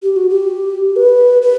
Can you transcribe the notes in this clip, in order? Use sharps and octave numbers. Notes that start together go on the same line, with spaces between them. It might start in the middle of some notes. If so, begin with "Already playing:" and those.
G4
F#4
G4
B4
B4